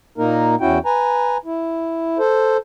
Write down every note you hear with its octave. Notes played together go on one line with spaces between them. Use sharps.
A#2 A#3 D#4 A#4
E2 C#4 E4 F#4 G5
B4 G#5 A#5
E4
A4 C5